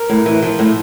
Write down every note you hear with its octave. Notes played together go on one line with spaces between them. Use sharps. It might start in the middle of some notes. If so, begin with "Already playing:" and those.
Already playing: A#4
A2
E3
F3
A2